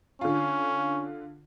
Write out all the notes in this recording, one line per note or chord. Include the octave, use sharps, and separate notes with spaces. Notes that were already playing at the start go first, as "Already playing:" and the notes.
D3 C#4 F4